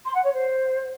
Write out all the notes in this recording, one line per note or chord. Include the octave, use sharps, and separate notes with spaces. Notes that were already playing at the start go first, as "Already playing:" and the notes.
C6
F#5
C#5
C5